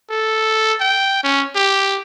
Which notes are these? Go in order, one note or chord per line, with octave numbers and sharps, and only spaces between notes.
A4
G5
C#4
G4